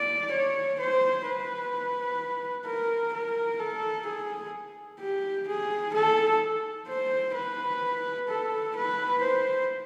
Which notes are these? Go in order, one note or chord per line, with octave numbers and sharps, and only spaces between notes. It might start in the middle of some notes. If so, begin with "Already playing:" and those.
Already playing: D5
C#5
C5
B4
A#4
A#4
A4
G#4
G4
G#4
A4
C5
B4
A4
B4
C5